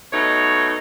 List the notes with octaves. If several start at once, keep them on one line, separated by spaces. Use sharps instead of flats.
B2 A3 D#4 C#5